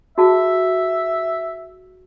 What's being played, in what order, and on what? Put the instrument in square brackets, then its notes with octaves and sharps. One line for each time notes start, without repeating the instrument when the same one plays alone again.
[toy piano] F#4 G#4 A5 [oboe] E5